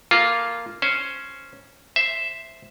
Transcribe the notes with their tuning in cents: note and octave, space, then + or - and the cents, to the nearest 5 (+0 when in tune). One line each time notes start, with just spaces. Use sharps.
A#3 +0 F4 -5 A4 -20
C#4 +0 C5 +0
C5 +0 E5 +0